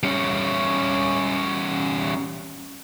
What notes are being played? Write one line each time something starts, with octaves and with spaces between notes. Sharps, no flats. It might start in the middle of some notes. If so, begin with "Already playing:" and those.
G3 C#4